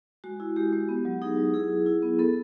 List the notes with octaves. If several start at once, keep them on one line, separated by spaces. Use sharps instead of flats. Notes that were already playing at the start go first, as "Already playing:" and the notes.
G#3 F#4
E4
G#3 G4
G#3
B3
F#3
D#4 G#4
F#3
E4 G#4
E4
E4
B3
B3 A4